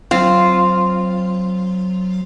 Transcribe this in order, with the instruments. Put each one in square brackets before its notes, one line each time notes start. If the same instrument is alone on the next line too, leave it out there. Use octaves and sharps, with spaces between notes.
[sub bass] F#3 [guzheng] C4 [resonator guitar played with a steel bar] F4